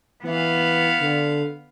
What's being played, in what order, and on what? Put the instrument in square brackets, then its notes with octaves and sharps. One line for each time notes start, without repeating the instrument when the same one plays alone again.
[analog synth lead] E3 [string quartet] B3 F5
[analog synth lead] D3